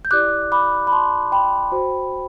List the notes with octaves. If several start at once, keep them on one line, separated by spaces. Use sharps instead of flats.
G6
E4 G4 D5 D6 F#6
B5 D6
B5
A5 C6
G5 B5
F#4 C5